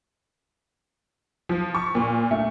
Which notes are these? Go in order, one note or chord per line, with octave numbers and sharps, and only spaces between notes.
F3
C#6
A#2
A3